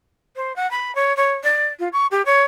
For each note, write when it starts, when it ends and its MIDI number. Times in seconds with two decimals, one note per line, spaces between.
0.36 0.55 72
0.56 0.69 78
0.71 0.94 83
0.95 1.15 73
1.17 1.33 73
1.44 1.67 74
1.79 1.88 65
1.93 2.07 85
2.11 2.22 67
2.26 2.42 73